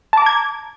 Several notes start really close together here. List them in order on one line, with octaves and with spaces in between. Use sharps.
A5 D6 A#5 G#6